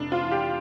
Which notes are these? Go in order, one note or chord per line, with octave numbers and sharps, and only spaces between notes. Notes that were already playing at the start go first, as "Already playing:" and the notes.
Already playing: F1 D4
F4
E3
G4